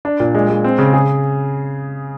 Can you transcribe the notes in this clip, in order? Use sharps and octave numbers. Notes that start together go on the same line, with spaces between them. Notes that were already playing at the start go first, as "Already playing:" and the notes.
D4
A#2
G#3
G#3
C4
C#3
G#4